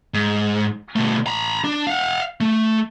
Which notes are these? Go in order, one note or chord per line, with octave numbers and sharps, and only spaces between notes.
G#2
B2 A3
A#5 B5
D4
F5 F#5
A3